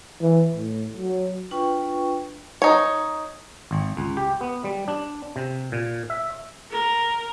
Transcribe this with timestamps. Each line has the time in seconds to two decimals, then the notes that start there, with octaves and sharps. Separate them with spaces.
0.21 E3
0.54 A2
0.97 F#3
1.51 D4 F4 B4 G5 C#6
2.62 D#4 C#5
3.71 G#1
3.97 C#2
4.17 G4
4.41 B3
4.64 G3
4.88 D4
5.36 C3
5.72 A#2
6.10 E5
6.71 A#4